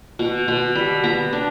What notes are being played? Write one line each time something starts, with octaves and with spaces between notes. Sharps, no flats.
B2
B2
G3 B5
B3 A#5
D4